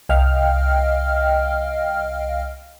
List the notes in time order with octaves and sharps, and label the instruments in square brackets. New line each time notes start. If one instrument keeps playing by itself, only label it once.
[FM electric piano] C2 D#5 F5 G5 F6